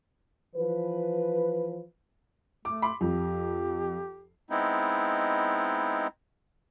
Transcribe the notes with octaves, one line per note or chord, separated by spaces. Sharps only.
E3 F3 B4
A3 D6
B5 C6 D6
F2 G4
G#3 B3 C4 D#4 E4